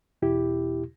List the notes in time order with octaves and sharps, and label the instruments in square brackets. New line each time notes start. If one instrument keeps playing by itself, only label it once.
[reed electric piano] E2 B2 E4 G4